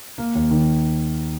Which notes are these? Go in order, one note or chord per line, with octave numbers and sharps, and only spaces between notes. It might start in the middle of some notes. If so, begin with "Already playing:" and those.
A#3
D#2
D#3